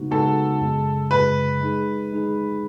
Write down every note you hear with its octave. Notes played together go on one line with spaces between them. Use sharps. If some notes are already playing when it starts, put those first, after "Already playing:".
Already playing: C#3 G#3 B3 D#4 F#4
C#3 G#3 B3 D#4 F#4 A4
F#2 C#3 G#3
F#2 C#3 G#3 B4
G#3 D#4 G#4
G#3 D#4 G#4